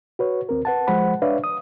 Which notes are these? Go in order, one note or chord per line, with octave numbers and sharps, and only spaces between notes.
F#4 B4 C#5
D#2 C4 A#4
B4 F#5 A5
F3 G#3 C5 F#5 B5
D4 B4 C#5 D5 E5 F5
D#6